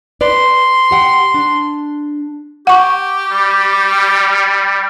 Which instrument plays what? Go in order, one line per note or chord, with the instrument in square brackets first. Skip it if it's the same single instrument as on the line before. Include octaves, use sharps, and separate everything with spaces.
[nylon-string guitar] B4 D5 [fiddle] C6
[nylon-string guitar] G4 F#5 G5
D4
[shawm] G4 [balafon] F#5 C#6
[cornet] G3